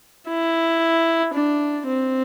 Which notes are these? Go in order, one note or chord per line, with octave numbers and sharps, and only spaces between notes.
E4
D4
C4